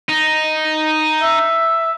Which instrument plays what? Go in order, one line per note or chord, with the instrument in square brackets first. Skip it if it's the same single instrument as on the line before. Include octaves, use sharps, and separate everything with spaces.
[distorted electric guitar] D#4
[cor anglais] E5